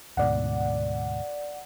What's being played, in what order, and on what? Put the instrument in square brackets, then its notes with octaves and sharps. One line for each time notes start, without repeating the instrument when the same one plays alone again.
[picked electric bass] D2 G#2 B2 [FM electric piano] D5 F#5